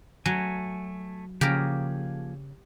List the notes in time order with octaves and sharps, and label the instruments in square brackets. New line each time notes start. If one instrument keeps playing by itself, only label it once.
[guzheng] F#3 [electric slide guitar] A3 G#5
[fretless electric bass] C#3 [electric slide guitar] F3 A#3 G#4 [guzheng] G4 A#4